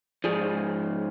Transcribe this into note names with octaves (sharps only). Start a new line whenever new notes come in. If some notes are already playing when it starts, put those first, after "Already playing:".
G#2 F3 G#4